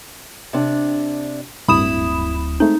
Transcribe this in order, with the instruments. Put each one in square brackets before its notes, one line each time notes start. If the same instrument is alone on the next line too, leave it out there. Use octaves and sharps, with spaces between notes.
[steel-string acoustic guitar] C3 D4
[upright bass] D1 [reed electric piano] G2 [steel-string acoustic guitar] E4 [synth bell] B5 D#6 E7
[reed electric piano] G#3 A3 C4 [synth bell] D#4